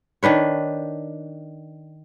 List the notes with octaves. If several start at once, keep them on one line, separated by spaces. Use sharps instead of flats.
D#3 D4 B4 C#5